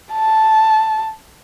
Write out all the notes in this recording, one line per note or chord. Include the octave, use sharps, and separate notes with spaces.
A5